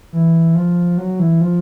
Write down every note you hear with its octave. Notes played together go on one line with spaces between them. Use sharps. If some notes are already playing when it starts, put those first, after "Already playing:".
E3
F3
F#3
E3
F3